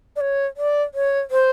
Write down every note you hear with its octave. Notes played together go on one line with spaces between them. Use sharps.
D5
C#5
D5
C#5
C5